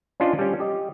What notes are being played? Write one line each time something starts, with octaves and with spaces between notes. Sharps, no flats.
C#4 D4 F4 C5 D5 D#5
G3 C#4
G4 D#5